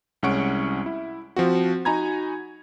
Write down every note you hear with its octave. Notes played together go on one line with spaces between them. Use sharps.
C2 G#3 C#4 F#5 C#6 D7
E4
F3 C4 F#4
D#4 F#4 G#5 A#5 B5 G#6